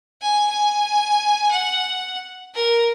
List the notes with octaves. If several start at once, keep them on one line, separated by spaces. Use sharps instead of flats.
G#5
G#5
F#5
A#4